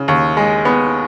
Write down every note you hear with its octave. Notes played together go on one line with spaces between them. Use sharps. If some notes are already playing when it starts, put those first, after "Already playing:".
Already playing: C#3
D#2
G#3
B3